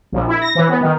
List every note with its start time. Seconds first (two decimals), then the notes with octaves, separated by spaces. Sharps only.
0.12 A#1
0.28 E4
0.42 A#6
0.55 E3
0.69 B3
0.81 D#3